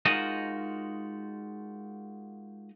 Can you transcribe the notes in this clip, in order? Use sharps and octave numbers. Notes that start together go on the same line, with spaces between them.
G#3 D#4 F4 F#4 A#4 D#5